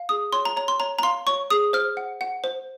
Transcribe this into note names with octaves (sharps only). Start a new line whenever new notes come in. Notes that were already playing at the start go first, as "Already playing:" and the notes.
Already playing: F5
G#4 D#6
C#5 C6
A#5
C#5 A#5
C6
C#5 A#5
A#5
F5 C6
C#5 C#6
G#4 D#6
C5 F6
F#5
F#5
C5